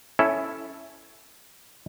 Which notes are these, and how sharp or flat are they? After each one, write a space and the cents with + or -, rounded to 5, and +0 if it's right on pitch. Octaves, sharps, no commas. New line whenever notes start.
C#4 +5 E4 +0 A4 +0